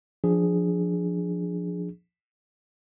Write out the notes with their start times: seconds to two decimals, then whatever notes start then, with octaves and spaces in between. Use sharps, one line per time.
0.24 F3 D4 G#4